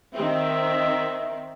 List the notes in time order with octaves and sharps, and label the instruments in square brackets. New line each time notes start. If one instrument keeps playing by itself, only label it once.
[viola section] D#3 C4 [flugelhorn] E5